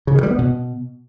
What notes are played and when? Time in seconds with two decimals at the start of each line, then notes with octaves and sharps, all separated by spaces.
0.07 C#3
0.15 D#3
0.23 G3
0.31 B3
0.38 B2